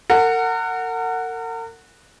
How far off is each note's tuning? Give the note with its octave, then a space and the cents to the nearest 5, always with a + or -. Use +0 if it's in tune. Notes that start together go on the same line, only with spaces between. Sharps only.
A#4 -40 F#5 +0